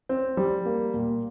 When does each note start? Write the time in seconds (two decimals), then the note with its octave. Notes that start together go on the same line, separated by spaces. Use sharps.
0.09 C4
0.37 G3
0.66 A#3
0.94 A#2